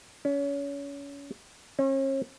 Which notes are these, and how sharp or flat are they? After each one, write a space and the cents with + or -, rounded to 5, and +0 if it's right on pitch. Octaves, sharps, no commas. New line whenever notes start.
C#4 +30
C#4 -40